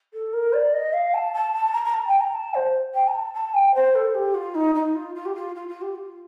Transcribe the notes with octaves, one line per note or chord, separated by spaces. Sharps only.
A4
A#4
D5
D#5
F5
A5
A5
A5
A#5
A#5
A5
G5
A#5
A5
C5
G5
A#5
A5
A5
G5
C5
A4
G4
F4
D#4
D#4
F4
F4
G4
F4
F4
F4
G4
F4